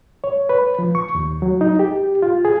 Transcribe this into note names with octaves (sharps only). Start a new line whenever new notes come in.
C#5
B4
F3
C#6
D#2
F#3
D#4
G4
F4
G#4